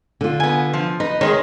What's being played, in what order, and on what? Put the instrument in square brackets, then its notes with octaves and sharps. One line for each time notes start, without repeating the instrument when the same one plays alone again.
[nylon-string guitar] D3 F4
[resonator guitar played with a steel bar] B3 G#5
F3
[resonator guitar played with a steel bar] D#4 [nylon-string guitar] B4
[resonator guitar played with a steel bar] D#3 G#3 G#4 [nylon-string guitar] C#5